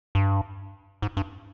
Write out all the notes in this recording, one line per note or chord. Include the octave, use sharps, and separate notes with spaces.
G2
G#2
G2